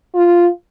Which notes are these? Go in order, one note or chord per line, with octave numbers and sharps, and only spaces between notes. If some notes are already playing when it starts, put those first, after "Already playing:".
F4